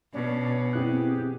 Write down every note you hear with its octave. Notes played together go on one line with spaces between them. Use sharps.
B2 C#4 D4
C4 E4 G4 G#4 F#6